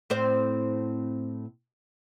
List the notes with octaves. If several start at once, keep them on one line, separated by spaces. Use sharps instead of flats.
A2 C4 C5